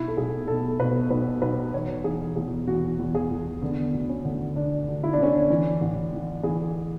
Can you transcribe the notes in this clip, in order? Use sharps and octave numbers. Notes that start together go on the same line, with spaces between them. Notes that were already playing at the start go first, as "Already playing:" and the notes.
Already playing: B1 E4
A4
B1 G#4
B2 A4
B2 B4
B1 B4
B1 B4
E1 C#5
E3 G#4
E2 G#4
E3 F#4
E2
G#4
E2
D3 B3
D2
C#4
D2
D2 D4
D2
E4
D4
D3 C#4
D4
E3
A1
E3
E3 G#4